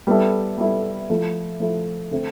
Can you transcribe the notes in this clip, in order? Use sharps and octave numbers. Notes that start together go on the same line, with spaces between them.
G3 B3 E4 A4
G3 B3 E4 A4
F3 A3 E4
F3 A3 E4
D3 A3 C4